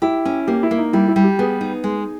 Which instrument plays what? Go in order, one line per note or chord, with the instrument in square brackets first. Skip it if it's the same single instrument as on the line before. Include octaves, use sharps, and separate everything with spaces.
[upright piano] E4 [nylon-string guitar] G4
[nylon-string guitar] C#4
[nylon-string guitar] A#3 [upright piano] G4
[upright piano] E4
[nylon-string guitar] A#3
[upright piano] D#4
[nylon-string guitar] G3 [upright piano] E4
[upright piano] E4
[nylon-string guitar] G3
[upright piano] G4
[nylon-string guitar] B3 [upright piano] G#4
[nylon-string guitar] D#4
G#3